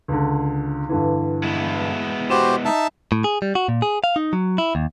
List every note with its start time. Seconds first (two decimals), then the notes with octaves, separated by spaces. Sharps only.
0.08 C#2 D3
0.89 G2 D3 E3
1.43 G#3 B3 E4
2.30 F#4 G4 C5 E7
2.65 D#4 E5 A5
3.12 A2
3.24 G#4
3.42 G3
3.55 F#4
3.68 A#2
3.82 G#4
4.04 F5
4.16 D#4
4.33 F#3
4.58 E4
4.75 D#2